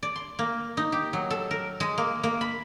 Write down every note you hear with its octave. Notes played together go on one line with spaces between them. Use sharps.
D5
C6
A#3
D#4
G4
F#3
A4
A#4
G#3
A#3
A#3
B5